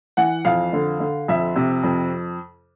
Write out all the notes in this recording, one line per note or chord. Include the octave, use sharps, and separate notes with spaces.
E3 F#5
F2 F5
D3
D3
F2 E5
C3
F2